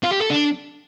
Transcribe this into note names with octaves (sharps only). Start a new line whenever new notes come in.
F4
G4
A4
D4